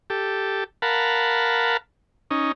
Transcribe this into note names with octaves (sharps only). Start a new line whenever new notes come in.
G4 A4
A#4 F5 F#5 A5 B5
C#4 D#4